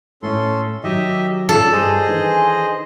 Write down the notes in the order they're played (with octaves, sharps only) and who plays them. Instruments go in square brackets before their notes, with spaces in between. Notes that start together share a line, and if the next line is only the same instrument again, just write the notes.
[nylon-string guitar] A2 A3 E4 [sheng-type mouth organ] C#4 A4 C6
[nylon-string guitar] D#3 F#3 [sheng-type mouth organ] G4 D#5 E5
[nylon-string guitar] C#4 F4 [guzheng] A4 [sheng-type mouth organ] D5
[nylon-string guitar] G2 G4 [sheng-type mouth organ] G#4 C5 D#5 [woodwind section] G#5
[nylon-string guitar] D#3 E3 D4